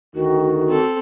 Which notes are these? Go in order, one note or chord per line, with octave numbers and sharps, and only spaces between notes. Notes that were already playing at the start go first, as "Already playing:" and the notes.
D2 D#3 F#4
C4 A4